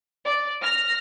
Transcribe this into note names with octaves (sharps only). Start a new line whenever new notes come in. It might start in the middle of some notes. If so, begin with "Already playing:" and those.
D5
F6 A#6